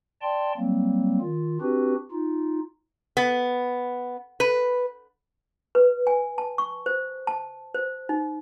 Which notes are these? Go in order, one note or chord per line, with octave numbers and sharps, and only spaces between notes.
D5 G5 A5 C6
F#3 G3 A#3 C4
D#3 F4
C4 D4 F#4 G4 B4
D#4 F4
B3
B4
B4
G#5
A5
C#6
C5
A5
C5
D#4